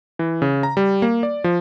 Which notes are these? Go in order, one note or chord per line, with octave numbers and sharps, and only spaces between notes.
E3
C#3
A#5
G3
A#3
D5
F3